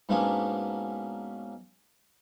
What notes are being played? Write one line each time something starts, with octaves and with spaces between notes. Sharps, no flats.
G#2 B2 G#3 A#3 C#4 D4